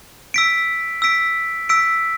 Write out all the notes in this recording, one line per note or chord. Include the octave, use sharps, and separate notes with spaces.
E6 B6 D7
E6 B6 D7
E6 B6 D7